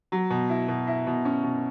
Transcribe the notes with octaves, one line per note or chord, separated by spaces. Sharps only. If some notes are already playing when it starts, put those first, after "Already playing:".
F#3
B2
E4
B2
E4
B2
C#4
B2